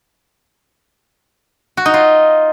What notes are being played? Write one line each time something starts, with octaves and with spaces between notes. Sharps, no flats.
F#4
D#4
F4